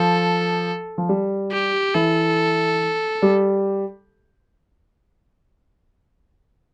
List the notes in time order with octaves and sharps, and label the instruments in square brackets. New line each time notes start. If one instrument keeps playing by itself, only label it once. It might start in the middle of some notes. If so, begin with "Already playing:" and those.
Already playing: [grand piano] F3 [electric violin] A4
[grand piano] F3
G3
[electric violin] G4
[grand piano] E3 E4 [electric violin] A4
[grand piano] G3 G4